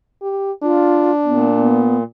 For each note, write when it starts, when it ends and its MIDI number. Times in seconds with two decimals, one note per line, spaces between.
0.22 0.52 67
0.63 1.97 62
0.63 1.11 65
1.25 2.03 46
1.25 1.47 59
1.58 1.97 59